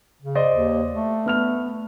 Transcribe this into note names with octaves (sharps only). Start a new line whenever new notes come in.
C#3
C5 D5 D#5
D#2
A3
B3 F6 F7